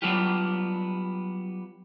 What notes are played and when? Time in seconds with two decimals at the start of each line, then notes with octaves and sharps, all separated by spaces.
0.02 F#3 G3 B3 D4 F4 G4